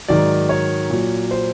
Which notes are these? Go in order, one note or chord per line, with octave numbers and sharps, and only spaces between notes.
G#2 D#3 F#3 D5
C#5
A#2 F#3
C5